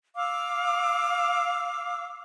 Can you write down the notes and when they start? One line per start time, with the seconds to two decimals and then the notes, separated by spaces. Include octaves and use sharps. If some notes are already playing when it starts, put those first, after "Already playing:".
0.16 F5 D6 E6